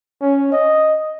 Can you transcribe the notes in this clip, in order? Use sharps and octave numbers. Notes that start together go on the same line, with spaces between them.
C#4
D#5